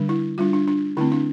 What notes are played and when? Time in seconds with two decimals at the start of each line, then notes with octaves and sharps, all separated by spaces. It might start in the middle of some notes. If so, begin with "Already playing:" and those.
Already playing: D3 G3 D4
0.09 E4
0.38 G3 D4 F4
0.53 D4
0.68 D4
0.97 D3 A3 C4 E4
1.12 D4